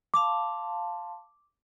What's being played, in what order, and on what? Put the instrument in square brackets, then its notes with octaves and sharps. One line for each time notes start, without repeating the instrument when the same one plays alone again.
[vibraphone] F5 A5 C6 [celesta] D6